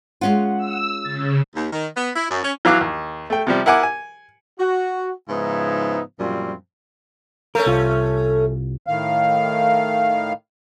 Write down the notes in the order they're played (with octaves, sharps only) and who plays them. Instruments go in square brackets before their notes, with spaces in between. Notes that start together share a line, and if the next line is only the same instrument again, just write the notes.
[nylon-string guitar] G#3 C#4 F4 [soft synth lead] F#5
[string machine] E6
[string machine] C#3 [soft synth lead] A6
[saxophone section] D#2
D#3
B3
E4
F#2
C#4
[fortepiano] E3 F#3 F5 D6 F#6
D#2
A3 G5
C3 F3 G3
E4 A#4 F#5 G#5 D6
G#5
[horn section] F#4
G#2 C#3 F3 B3 D#4 E4
F#2 A#2 F3 G3 C4 C#4
[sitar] A3 C#4 [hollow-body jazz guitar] A#4
[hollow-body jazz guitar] C2 F4
[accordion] A2 D#3 F5